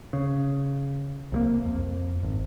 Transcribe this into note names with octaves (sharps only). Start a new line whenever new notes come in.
C#3
C2 F#3 A#3
F2
G#1